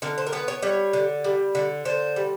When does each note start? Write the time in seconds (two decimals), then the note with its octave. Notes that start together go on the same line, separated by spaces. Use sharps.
0.02 D3 A#4
0.18 C5
0.27 A#4
0.32 B3 B4
0.48 C#5
0.62 G3 C#5
0.93 D3
1.24 G3
1.55 D3
1.85 D3 C5
2.16 G3